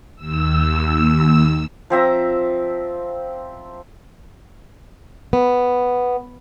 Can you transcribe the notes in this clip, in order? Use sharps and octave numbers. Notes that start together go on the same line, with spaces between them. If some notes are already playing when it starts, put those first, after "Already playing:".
D#2 E6
F3 C4 E5 A#5
B3